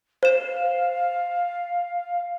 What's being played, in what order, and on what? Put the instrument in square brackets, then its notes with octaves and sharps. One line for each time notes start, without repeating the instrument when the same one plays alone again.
[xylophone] C5 E7 [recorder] F5